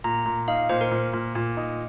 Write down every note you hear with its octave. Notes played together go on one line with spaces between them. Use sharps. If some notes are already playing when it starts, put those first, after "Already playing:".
A#2 A#5
A#2
D#4 F5
A#2 C5
A#4
A#2
A#2
A#2
D#4